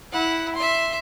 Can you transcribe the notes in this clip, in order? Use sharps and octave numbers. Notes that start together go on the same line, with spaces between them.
E4 F#5
E5 C6